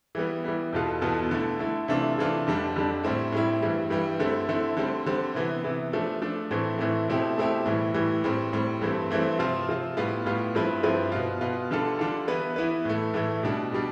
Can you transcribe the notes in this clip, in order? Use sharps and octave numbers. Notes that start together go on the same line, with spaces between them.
E3 G3 B3
E3 G3 B3
E2 B2 B3 F4 A4
E2 B2 B3 F4 A4
D3 A3 E4
D3 A3 E4
C3 E3 A3 D4 F4
C3 E3 A3 D4 F4
F2 D3 G3 D4
F2 D3 G3 D4
A2 G3 C4 E4
A2 G3 C4 E4
G2 E3 G3
G2 E3 G3
D3 A3 C4 E4
D3 A3 C4 E4
D3 G3 C4
D3 G3 C4
C3 E3 B3
C3 E3 B3
F3 A3 D4
F3 A3 D4
A2 E3 A3 C4
A2 E3 A3 C4
B2 A3 C4 E4 G4
B2 A3 C4 E4 G4
A2 E3 G3
A2 E3 G3
A2 G3 C4
A2 G3 C4
G2 E3 A3 C4
G2 E3 A3 C4
C3 F3 C4 F4
C3 F3 C4 F4
A2 G3 B3 F4
A2 G3 B3 F4
G2 F3 C4 E4 B4
G2 F3 C4 E4 B4
B2 B3 F4
B2 B3 F4
D3 G3 D4 F4 A4
D3 G3 D4 F4 A4
E3 B3 E4 B4
E3 B3 E4 B4
A2 E3 A3
A2 E3 A3
B2 G3 D4
B2 G3 D4